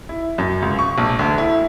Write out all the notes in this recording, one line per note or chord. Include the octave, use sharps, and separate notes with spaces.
E4
F#2
C#2
C#6
A#1
D2
E4